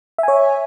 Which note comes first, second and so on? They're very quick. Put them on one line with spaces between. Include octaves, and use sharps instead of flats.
E5 G#5 C#5